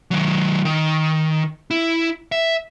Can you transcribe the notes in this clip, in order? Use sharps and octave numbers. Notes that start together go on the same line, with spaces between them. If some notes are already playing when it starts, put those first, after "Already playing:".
D#3 F#3
D#3
E4
E5